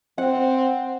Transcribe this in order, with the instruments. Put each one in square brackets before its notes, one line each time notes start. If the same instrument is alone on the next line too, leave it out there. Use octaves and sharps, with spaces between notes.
[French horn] C4 [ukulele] F#5